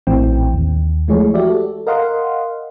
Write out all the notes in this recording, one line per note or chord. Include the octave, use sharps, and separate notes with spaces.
A#1 A2 E3 C4 G5
D#2
E3 F3 G#3 A3 G#4 C#5
F#4 G4 D5 E5
A4
A#4 D#5 F5 F#5 C6